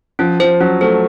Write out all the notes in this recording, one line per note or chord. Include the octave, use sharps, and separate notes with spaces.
F3 C#4
F3 C5
F#3 C#4
A3 C5